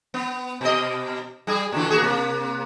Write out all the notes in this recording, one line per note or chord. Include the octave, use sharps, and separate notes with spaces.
B3
B2 D#5
G3 G#4
A#2 D3 E3
A#3 F#4 G#4
C3 A#3